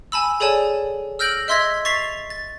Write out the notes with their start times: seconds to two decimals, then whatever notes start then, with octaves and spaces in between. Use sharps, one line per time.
0.12 G#5 A5 B5 E6
0.40 G#4 A4 C#5 D5 G#5 A5
1.19 E6 F6 G6 A#6 D7 F#7
1.48 D#5 E5 C6 E6 G#6 B6
1.85 C#6 A6 B6 C7 F7
2.30 A6